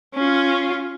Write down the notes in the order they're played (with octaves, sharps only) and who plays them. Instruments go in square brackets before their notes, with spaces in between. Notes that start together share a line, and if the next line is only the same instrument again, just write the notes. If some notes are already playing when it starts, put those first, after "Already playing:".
[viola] C#4 F4